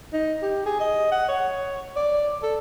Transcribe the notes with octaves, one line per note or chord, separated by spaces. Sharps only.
D#4
G4
G#4
D#5
F#5
C#5
D5
A4